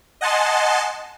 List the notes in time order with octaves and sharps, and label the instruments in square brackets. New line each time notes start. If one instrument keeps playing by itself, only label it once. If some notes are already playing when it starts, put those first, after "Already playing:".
[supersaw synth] D#5 F#5 G#5 A5 C6